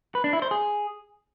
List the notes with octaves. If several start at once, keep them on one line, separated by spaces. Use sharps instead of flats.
B4
D4
E4
C5
G#4